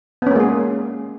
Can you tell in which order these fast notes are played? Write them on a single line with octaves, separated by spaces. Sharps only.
B3 C#4 A#3 G#3 G#4